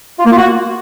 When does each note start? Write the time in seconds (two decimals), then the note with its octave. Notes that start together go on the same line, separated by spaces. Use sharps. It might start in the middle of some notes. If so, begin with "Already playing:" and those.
0.19 F4
0.25 A#3
0.31 F4
0.37 F#4